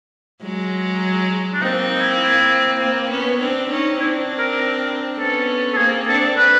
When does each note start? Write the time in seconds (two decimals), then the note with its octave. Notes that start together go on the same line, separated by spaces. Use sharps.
0.42 F#3 G#3
1.54 D4
1.61 A#3 C4 D#4
1.92 D#4
2.01 E4
2.20 E4
2.80 A#3 C4
3.10 B3 C#4
3.40 C4 D4
3.70 C#4 D#4
3.99 C4 D4 E4
4.38 A#4
5.18 B3 C#4 A4
5.73 A4
5.77 A#3 C4 G#4
6.08 C4 D4 A4
6.38 B4